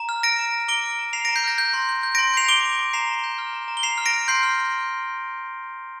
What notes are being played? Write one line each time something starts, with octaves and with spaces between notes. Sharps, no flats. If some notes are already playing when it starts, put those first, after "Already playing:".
Already playing: A#5
F6
F6 A#6 D7
A#5
A#5
D6 D7 G7
F6
A#5
A#5 C7 F7
A#6 D7
A#5
G6 C7
F6 A#6
G6
C6
G6
G6
A#6 D7
C6
G6 C7 F7
D6 D7 G7
D6
D6
A#5 C7 F7
A#5
G6
F6
A#5
A#5
G7
A#5 C7 F7
F6
A#6 D7
F6
C6 G6 C7
F6